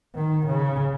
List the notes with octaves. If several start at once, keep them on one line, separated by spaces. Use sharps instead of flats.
D#3
C#3